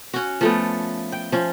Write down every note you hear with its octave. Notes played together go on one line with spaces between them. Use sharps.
C#4 F#4
F3 A3 B3
G5
F3 C#4